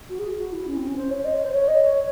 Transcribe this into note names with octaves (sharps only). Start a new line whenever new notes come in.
F#4
G#4
F#4
E4
C#4
C4
C#4
C5
C#5
D#5
C#5
C5
C#5
D#5
C#5